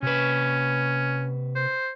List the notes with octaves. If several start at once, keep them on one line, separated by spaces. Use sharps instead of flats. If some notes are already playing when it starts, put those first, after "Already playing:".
C3 C#4 B4
C5